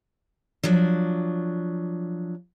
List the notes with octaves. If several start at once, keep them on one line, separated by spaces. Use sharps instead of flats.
F3 F#3 D4